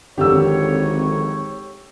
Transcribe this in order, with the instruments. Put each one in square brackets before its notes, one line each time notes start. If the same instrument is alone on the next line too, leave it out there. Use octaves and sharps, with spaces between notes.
[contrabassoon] G#1 [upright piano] F2 D3 D#3 [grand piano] G4 E6 [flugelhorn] C#5